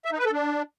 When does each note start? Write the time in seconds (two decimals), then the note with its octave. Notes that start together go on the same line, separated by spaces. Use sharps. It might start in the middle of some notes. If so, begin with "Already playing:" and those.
0.05 E5
0.12 D#4
0.19 B4
0.25 A4
0.32 D4